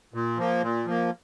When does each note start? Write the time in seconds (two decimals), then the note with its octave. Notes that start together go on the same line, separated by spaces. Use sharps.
0.14 A#2
0.38 F3 A#3
0.62 A#2
0.86 F3 A#3